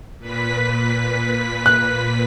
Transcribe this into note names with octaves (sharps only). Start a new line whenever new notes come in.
A#2 B4 B6
F#6